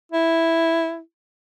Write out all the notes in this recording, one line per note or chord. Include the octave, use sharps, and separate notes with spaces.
E4